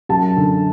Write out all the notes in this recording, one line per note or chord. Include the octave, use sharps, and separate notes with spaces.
F#2 A5
D3